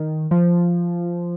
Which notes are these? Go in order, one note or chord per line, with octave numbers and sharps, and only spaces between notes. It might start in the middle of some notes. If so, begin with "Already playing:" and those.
Already playing: D#3
F3